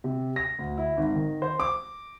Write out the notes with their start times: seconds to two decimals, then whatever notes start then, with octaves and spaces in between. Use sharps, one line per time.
0.04 C3
0.36 A#6
0.59 D2
0.78 E4
0.97 G#1
1.15 D#3
1.42 C5
1.60 D6